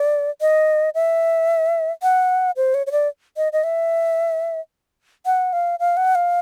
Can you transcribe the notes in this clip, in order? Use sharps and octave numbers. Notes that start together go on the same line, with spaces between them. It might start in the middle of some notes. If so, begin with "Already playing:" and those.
Already playing: D5
D#5
E5
F#5
C5
C#5
C#5
D5
D#5
D#5
E5
F#5
F5
F5
F#5
F5